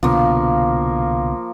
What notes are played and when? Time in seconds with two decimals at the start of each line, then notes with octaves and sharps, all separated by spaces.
0.03 C2 B2 D3 F3 A#3